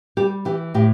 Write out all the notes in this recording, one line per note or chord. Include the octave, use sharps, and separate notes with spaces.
G3 G4
E3 G4
A2 G4